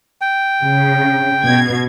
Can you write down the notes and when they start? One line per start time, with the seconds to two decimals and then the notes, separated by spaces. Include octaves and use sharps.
0.21 G5
0.63 C#3
1.44 B2 G#6